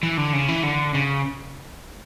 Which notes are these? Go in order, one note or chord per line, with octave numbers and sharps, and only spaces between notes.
E3
D3
C#3
E3
D3
C#3